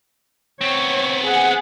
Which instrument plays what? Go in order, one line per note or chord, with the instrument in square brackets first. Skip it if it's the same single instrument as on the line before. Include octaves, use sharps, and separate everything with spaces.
[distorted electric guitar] B3 C4 [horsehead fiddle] C#5
[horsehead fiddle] G#4 F#5